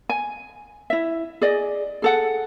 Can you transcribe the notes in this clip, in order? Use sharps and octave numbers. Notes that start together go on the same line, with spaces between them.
G#5
E4 E5
G#4 D5 D#5
G#4 A4 F#5